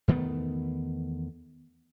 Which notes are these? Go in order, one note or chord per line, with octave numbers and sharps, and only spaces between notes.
E2 D#3 A3 B3